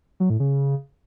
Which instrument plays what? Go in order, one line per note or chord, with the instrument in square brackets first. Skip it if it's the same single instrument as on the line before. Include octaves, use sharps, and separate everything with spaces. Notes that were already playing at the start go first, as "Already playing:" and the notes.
[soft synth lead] F#3
A2
C#3